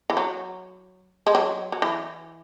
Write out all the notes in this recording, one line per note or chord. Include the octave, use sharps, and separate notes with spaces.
E3
F#3
G#3
F#3
F#3
E3